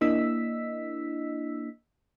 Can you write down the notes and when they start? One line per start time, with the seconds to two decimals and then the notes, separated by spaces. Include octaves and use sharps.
0.01 A#3 D4 E4 D#5 E6 B6